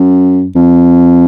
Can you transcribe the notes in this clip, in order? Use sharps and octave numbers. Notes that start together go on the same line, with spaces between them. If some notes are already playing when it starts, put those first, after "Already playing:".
Already playing: F#2
F2